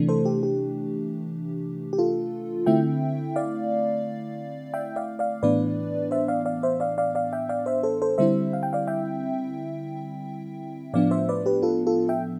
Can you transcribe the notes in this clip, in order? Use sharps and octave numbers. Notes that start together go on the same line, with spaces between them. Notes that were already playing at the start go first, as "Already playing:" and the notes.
Already playing: C3 E3 A3 D4
A4 C5
G4
G4
G4
F4 A4
D3 A3 C4 E4 E5 G5
D5 F5
E5 G5
D5 F5
D5 F5
A2 E3 B3 D4 B4 D5
C5 E5
D5 F5
D5 F5
C5 E5
D5 F5
D5 F5
D5 F5
E5 G5
D5 F5
C5 E5
A4 C5
A4 C5
D3 G3 C4 E4 C5 E5
F5
G5
D5 F5
E5 G5
A2 F3 B3 D4 D5 F5
C5 E5
B4 D5
G4 B4
F4 A4
F4 A4
E5 G5